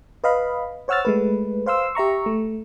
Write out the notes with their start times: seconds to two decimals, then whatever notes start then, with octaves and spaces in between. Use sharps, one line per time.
0.24 B4 D#5 F5 B5
0.88 C5 C#5 F#5 E6 F6 A6
1.05 G#3 A3 B4
1.66 C5 F5 C6 E6
1.95 G4 E5 A#5 C#6
2.26 A3